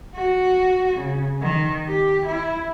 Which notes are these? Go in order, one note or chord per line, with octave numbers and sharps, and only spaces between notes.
F#4
C#3
D#3
G4
E4